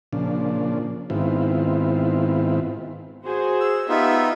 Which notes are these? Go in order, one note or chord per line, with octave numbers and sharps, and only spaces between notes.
A#2 C#3 F3 D4
G#2 D#3 B3 C4 E4 F4
F#4 G#4 C5
E6
B3 D#4 F4 G4 E5